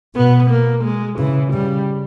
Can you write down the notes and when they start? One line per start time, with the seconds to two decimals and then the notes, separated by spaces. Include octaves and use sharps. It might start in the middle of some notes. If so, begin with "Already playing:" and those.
0.16 B2 B3
0.50 A#3
0.84 G#3
1.18 C#3 E3
1.53 C#3 G3